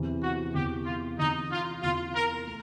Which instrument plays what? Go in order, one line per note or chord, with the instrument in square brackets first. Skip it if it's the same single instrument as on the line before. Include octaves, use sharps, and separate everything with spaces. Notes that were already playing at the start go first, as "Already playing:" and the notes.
Already playing: [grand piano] E2 C3 E3
[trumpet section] F#4
[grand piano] E2 C3 E3 [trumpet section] G4
[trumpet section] F4
[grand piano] E2 C3 E3 [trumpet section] D#4
[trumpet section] F4
[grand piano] E2 C3 E3 [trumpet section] F4
[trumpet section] A#4
[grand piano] A3